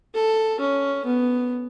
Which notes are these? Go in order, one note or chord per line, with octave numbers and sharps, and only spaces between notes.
A4
C#4
B3